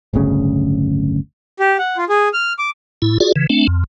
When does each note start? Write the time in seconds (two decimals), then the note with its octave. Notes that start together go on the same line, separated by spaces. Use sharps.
0.13 D1 G1 D2 C#3
1.60 G4
1.79 F#5
1.97 F4
2.09 G#4
2.33 F6
2.59 D6
3.02 A2 E4
3.20 F4 F#4 G#4 D5
3.36 C#3 E3
3.50 A3 C4 D4
3.67 F2